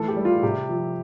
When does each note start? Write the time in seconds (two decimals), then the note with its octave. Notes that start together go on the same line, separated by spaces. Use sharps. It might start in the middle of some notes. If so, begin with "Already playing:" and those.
Already playing: E3 A3 A4
0.08 G4
0.16 G3
0.25 F4
0.42 C3 G4
0.69 F3